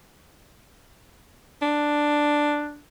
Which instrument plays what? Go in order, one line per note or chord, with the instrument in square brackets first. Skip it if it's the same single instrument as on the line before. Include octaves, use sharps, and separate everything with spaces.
[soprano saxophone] D4